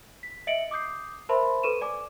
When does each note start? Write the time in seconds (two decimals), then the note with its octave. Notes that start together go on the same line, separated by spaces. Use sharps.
0.23 B6
0.47 D#5 E5 C#7 D7 F#7
0.71 D6 D#6 G6 C7
1.29 A#4 C5 E5 A5 B5 C6
1.63 A4 B4 C#6 D#7 E7
1.81 D5 G#5 D6